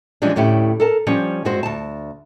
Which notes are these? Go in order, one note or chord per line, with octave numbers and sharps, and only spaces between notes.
E3 F3 G3 G#3 C#4 D4
D2 A2 C#4 E4 G4
A4 A#4 A5
F3 G3 C#4
G2 G#3 C4 F#4 C5
D2 A5